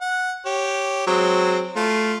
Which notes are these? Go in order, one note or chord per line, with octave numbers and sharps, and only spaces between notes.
F#5
G4 C#5
F#3 G#3 C4
A3 F4